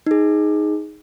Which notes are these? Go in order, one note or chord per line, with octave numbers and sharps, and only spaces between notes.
D#4 G#4